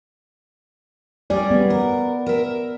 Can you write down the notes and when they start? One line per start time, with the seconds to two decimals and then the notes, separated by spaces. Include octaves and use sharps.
1.30 G3 C#4 G#4 D5
1.51 B3
1.70 A#4
2.26 A#4 E5